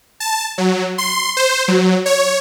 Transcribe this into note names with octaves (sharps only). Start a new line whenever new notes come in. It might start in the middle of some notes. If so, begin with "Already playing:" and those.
A5
F#3
C6
C5
F#3
C#5